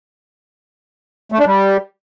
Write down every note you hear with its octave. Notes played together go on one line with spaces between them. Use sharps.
A3
D4
G3